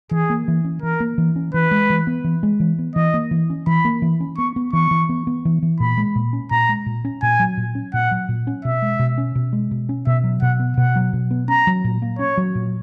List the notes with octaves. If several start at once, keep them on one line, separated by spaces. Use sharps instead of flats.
E3 G#4
A#3
E3
C#4
E3 A#4
A#3
E3
C#4
E3 B4
G#3
E3
B3
E3
G#3
E3
B3
E3 D#5
A#3
E3
C#4
E3 B5
A#3
E3
C#4
B3 C#6
B3
E3 C#6
E3
B3
B3
E3
E3
A#2 B5
G#3
A#2
C#4
A#2 A#5
G#3
A#2
C#4
A#2 G#5
F#3
A#2
C#4
A#2 F#5
F#3
A#2
C#4
B2 E5
G#3
B2
C#4
B2
G#3
B2
C#4
B2 E5
F#3
B2 F#5
B3
B2 F#5
F#3
B2
B3
C#4 A#5
F#3
A#2
A#3
C#4 C#5
F#3
A#2